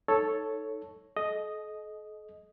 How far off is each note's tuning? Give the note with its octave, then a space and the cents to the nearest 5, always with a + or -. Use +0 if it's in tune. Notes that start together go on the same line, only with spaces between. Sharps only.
D#4 +0 A4 +0 C#5 +0
A4 -45 D#5 +0